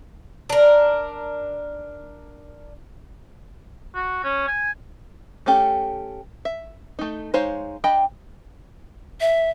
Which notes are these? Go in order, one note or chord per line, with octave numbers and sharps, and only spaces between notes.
D4 A#4
F#4
C#4
G#5
A3 C#4 G4 A4
E5
A3 D#4
G#3 D#4 C5 C#5 F5
D4 D#5 G5 B5
E5